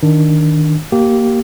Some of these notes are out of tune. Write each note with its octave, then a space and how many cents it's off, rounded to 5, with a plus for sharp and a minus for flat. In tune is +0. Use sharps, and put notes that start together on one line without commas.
D#3 +0 D4 +0
A#3 +0 G4 -20